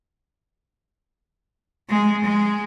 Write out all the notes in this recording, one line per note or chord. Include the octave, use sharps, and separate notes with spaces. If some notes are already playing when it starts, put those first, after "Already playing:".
G#3
G#3